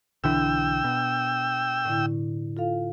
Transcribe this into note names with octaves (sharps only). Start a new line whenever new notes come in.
B1 D3 E3 D4 G5 E6
B2
A2 D3 E4
F4 A4 F5